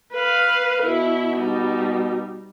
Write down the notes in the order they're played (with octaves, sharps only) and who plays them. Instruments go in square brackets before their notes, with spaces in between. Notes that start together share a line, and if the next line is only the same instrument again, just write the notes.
[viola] B4 F5
[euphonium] B2 [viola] E4
[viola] G3 D#4